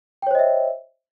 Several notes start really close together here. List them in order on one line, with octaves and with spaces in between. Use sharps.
G5 C#5 C5 D#5 E5